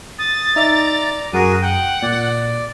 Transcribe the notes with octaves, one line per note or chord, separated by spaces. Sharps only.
D#6 A6
D#4 D5 E5 A#5
F#2 F#4 G#4 A#4 D#7
F#5 G5
A#2 D5